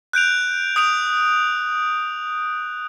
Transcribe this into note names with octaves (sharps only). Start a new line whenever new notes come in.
F#6 G6 D7 F7
D#6 G6 D7 F7